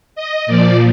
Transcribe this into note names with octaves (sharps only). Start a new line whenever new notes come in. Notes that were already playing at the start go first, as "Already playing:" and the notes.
D#5
A#2 F3 D5